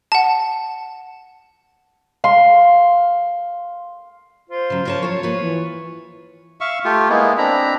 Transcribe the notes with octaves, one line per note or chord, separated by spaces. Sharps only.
F#5 A5
F5 C6
F4 C5
C#3 F#3
A#4 C#5 A5
F3 F#3 F4 C#5
A#3 F4 B4
E3
E5 F5 C#6
A3 F4 G4
G#3 A#3 B3 E4
C4 D4 A#5 B5